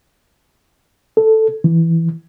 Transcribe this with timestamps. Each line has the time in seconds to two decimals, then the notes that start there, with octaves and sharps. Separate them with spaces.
1.17 A4
1.64 E3